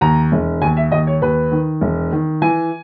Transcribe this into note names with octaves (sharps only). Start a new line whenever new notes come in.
D#2 A#5
E1
D#2 G#5
E5
D#2 D#5
C#5
D#2 B4
D#3
E1
D#3
E3 G#5